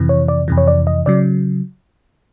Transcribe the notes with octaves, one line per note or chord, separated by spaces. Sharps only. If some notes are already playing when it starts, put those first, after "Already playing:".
Already playing: F2 C3 E3
C#5
D5
F2 C3 E3
C#5
D5
D#5
C#3 F#3 D5